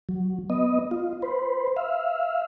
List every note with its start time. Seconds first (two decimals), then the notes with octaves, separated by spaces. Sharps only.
0.09 F#3
0.50 B3 D#5
0.91 F4
1.22 B4 C5
1.77 E5 F5